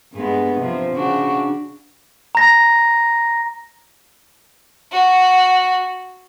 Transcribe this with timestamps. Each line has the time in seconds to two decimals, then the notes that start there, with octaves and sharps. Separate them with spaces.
0.13 G2 G#3 B3
0.57 C3 F3
0.94 C#3 D4 F#4
2.35 A#5 A#6
4.92 F#4